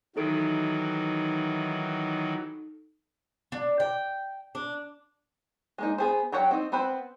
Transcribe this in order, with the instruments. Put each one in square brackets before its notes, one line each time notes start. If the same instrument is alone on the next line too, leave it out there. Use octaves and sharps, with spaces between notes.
[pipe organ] D#3 E3 F#3 [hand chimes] D#4 A4 D7
[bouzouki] D4
G5
D4
[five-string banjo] G#3 A#3 D#4
B3 G#4 C5
F#3 G4 C#5 F#5 G5
C4 D#4
B3 C4 B4 C5